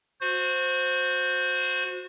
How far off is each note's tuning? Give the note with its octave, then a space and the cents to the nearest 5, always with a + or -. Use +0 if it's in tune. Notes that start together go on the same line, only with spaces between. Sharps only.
F#4 -25 C5 +0